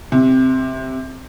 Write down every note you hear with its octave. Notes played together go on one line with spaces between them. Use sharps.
C3